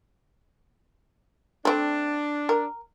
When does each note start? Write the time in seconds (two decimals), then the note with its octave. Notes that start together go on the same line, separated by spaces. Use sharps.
1.65 A3 C4 D4
2.49 A#4